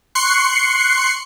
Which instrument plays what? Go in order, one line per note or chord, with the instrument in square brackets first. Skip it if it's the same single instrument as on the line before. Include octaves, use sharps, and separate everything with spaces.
[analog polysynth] C6 C#6 F#6 C7 C#7